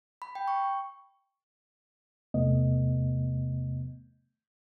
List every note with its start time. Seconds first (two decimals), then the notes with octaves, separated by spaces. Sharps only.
0.22 B5
0.35 G5
0.48 C#6
2.34 E2 C3 A3 B3 D#5